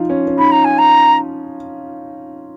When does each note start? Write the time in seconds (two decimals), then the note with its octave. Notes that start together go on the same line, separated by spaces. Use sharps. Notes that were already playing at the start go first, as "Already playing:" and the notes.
Already playing: F3 D#4 F4
0.09 C#4
0.27 C#4
0.38 D#4 B5
0.51 A#5
0.64 G#5
0.78 A#5